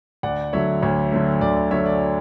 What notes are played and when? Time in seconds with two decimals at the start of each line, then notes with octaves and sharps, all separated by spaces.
0.23 D2 D5 F#5
0.53 D3 F#3 A3 C#5 E5
0.82 D2 C#5
1.12 D3 F#3 A3
1.41 D2 D5
1.56 D5
1.71 D3 F#3 A3 C#5 E5
1.86 D5